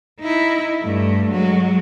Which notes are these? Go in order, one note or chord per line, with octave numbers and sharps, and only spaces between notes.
D#4 E4
G2 A3
F#3 G#3